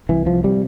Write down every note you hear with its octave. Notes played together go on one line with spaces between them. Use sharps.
C2 E3
F3
C3 G3